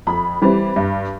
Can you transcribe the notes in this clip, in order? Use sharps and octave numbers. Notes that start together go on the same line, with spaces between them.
F2 B5
E3 G3 C4
G2